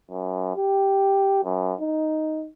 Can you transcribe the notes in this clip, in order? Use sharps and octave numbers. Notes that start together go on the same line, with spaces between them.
F#2
G4
F#2
D#4